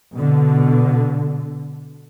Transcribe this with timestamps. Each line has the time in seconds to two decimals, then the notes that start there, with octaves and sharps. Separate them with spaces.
0.15 B2 D3